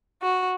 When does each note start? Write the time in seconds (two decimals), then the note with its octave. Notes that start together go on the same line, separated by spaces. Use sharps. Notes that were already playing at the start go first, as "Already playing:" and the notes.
0.23 F#4